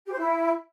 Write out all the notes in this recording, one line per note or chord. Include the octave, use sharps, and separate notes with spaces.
G4
C5
E4